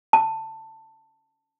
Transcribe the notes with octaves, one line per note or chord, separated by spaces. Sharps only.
A5